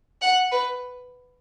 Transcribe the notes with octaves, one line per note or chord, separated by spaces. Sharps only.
F#5
B4